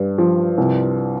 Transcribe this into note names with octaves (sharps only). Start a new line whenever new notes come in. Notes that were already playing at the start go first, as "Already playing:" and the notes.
Already playing: G2
F3
C2